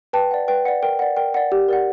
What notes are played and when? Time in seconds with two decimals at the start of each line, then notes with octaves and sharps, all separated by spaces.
0.13 B4 G5 A5
0.31 D5 F#5
0.48 B4 G5
0.65 D5 F#5
0.83 A#4 G5
0.99 D5 F#5
1.17 A#4 G5
1.34 D5 F#5
1.52 G4
1.68 A#4 D5 F#5